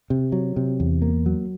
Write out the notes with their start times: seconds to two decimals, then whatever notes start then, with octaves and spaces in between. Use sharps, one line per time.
0.10 C3
0.32 F#3
0.56 C3
0.80 E2
1.02 A#3
1.26 F#3